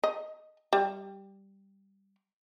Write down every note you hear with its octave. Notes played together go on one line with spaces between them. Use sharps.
D#5
G3